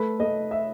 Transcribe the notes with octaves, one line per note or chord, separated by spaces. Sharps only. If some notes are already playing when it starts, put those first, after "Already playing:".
Already playing: A3 B4
A3 D#5
E5